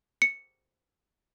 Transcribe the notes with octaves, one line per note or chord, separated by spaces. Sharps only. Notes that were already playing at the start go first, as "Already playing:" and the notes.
C#7